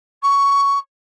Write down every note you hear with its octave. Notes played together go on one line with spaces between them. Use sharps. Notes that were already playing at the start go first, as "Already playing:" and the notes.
C#6